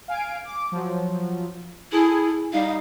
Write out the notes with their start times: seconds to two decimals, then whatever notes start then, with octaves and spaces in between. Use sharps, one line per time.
0.08 F5 G#5 D7
0.45 D6
0.72 F3 F#3
1.92 E4 G#4 A4 G#5
2.53 G3 D#4 F5